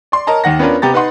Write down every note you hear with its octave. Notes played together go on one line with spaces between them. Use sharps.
D5 C6
A#4 C#5 D#5 A5 A#5
D#2 D#3 F#5 A#6
B3 C#4 D4 F4 A#4 B4
C3 B3 G4 A#5 A6
D#4 B4 D#5 F#5 C6